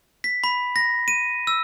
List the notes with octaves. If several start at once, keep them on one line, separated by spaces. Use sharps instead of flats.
B6
B5
A#6
D#7
E6